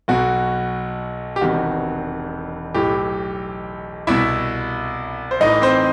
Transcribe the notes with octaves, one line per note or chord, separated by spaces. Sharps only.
B1 B2 F#4
G4
E1 E2 C3 D#3 F#4
B1 A2 E3 G4
C2 B2 E4 E5
C5
A1 A2 E3 D#4 D#5
C4 C5